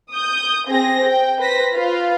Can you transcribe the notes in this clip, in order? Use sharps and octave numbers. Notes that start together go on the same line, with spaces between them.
D#6 G6
C4 G#4 A#6
G5
B4 C5 A#6 B6
F4 B4 F5